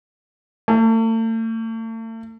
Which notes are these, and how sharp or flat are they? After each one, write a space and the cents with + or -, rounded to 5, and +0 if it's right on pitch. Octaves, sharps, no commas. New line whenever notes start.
A3 +40